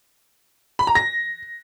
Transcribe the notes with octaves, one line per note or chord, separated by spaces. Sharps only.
B5
A#5
A#6